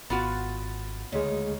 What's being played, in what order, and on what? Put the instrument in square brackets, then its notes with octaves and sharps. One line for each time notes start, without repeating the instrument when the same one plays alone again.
[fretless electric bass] G#1 [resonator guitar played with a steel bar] B3 F4 F#4 [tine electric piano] A6
[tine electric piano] D2 G#3 [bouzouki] C#3 D#4